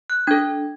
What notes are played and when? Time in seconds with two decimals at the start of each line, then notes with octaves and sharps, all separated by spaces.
0.10 F#6
0.27 D4 A4 G#6